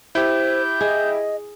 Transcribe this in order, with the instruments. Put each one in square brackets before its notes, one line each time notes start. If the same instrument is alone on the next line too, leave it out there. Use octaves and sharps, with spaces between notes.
[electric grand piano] E4 G4 [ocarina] C5 [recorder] G6
[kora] G#4 [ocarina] D#5